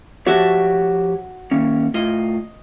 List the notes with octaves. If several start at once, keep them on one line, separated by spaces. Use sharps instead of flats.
F3 F#4 G4 C#5 E5 A5
D#3 A#3 C#4
A2 F4 D#5